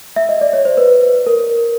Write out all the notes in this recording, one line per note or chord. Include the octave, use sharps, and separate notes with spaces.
E5
D#5
D5
C#5
C5
B4
A#4